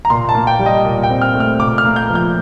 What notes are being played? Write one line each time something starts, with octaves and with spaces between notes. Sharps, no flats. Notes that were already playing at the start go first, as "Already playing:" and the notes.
A#5
A#2 C6
A5
A#3
G5
G3
D#5
A#2
G5
C4
F6
A3
F6
A#2 D6
F6
A#3
G6
F3
G6